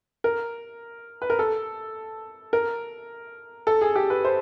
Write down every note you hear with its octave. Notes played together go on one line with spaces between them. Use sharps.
A#4
B4
A#4
A4
A#4
A4
G#4
G4
B4
C5